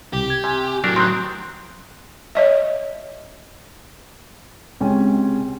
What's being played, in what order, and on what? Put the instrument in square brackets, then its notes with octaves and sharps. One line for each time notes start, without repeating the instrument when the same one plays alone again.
[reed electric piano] C2 [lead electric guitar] G4
[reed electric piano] G#6
[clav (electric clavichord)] C3 [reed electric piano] G#5
[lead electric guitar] A2 F#3 [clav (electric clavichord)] A3 D4 A#4
[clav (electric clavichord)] D#3 C4 [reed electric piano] C6 F#6
[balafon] C#5 D#5 E5
[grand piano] C#2 C3 G#3 C#4 G5 G#5